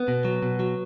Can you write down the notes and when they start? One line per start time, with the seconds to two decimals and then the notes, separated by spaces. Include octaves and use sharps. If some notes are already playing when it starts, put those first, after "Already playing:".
Already playing: B3
0.08 B2
0.25 F#3
0.43 B2
0.60 F#3